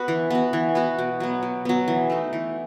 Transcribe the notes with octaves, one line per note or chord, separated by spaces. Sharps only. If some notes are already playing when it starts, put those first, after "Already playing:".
Already playing: B3 F#4 B4
E3
B3 F#4
E3
B3 F#4
B2
F#3 B3
B2
F#3 B3
E3
A3 D#4
E3